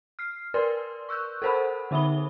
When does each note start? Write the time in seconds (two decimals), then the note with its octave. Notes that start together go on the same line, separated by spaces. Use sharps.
0.19 F6 C7
0.54 A#4 B4 D5 C6
1.09 C#6 E6 F#6 G6
1.42 A4 A#4 C5 F#5 B5
1.91 D3 D#4 E5 B5 D#6 G7